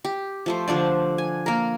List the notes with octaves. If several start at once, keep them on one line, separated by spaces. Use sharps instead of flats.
G4
F3 A3 C5
D3 F3 D4 D5
G#5
A#3 A#4